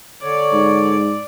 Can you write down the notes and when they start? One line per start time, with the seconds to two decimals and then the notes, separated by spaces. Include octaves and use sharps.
0.23 D3 C#5 D5
0.52 G#2